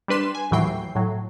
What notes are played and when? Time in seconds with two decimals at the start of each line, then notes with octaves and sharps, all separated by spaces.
0.08 G3 D4 B4 C6 E7
0.35 G#5
0.51 D#2 A2 E3 F#3 G5 C7
0.95 A2 F#3